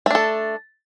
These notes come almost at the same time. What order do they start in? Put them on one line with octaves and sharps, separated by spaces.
A3 D4 A4